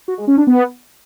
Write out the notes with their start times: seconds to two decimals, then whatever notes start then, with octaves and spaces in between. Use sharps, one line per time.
0.08 F#4
0.18 G#3
0.27 C#4
0.37 D4
0.47 B3